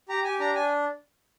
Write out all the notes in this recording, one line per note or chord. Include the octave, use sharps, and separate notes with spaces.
G4 A#5
G4 G#5
D4 A#5
D4 G#5